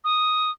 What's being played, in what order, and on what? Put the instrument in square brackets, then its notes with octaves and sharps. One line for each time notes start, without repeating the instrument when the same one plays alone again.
[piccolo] D#6